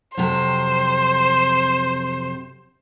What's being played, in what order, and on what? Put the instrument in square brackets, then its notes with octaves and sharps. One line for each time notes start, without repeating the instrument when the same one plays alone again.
[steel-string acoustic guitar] F2 C3 F#3 [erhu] C5